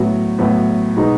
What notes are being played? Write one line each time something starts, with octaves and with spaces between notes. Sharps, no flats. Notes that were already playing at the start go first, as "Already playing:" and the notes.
Already playing: A2 F#3 B3
A2 F#3 B3
B2 G#3 B3 D#4 F#4